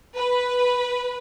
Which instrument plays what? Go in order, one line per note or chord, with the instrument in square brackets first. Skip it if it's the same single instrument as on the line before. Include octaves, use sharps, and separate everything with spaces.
[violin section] B4